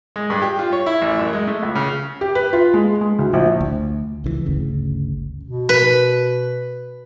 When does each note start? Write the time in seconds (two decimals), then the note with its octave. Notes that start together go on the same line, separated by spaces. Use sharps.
0.16 G#3
0.30 G2
0.42 G4
0.59 F4
0.73 C#5
0.86 E4
1.02 A1
1.19 F#2
1.33 G#3
1.47 A3
1.63 C#2
1.75 C#3
2.21 G4
2.35 B4
2.53 F4
2.74 G#3
3.01 G#3
3.19 D2
3.33 A#1
3.61 D2
4.24 C#2 D3 E3
4.46 G1 D2 C#3
5.43 B2
5.69 B4